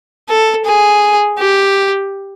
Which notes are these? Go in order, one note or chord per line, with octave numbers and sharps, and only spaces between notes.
A4
G#4
G4